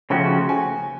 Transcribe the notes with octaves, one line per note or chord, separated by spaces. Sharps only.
C#3 F3 A3 C#4 F#4 G5
G#5